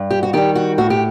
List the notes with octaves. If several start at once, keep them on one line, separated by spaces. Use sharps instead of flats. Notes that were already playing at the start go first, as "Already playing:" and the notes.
Already playing: G2
G4
F#4
D#3 G3 G4
F#4
A2 F#4
G4